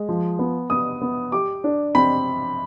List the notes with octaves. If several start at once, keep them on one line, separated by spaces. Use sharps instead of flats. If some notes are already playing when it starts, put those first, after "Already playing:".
Already playing: G#3
F3
B3
B3 D#6
B3
G4 D6
D4
C4 B5